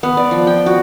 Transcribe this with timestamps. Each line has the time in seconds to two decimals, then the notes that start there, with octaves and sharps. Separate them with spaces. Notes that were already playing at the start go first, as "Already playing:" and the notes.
0.03 B3
0.17 D5
0.31 F3
0.47 G5
0.66 F#4